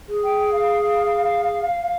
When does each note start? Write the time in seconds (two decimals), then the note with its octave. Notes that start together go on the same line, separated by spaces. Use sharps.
0.09 G#4
0.23 G5
0.52 F5